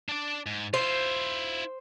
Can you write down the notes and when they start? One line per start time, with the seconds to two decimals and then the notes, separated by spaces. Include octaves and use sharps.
0.09 D4 D5
0.46 G#2
0.74 E4 F4 C5